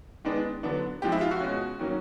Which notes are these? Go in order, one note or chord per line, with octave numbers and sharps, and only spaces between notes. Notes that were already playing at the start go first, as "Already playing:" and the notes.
D#3 G#3 B3 D4
D3 F#3 B3 D4
F3 G#3 C4 G4
E4
F4
F#4
B2 G#3 C#4
D#3 F#3 A#3 C#4